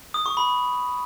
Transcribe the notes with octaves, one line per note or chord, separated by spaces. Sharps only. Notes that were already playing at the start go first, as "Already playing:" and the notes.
D#6
C#6
B5